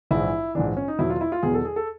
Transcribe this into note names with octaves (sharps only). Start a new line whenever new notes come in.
A#1 G#2 E3 E4
A#1 G#2 E3 D4
C#4
D#4
E2 B2 F#3 E4
F4
E4
F4
E2 B2 F#3 G#4
A4
G#4
A4